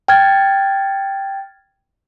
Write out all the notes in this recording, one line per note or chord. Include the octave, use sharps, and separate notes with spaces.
G5 F6 G#6 A6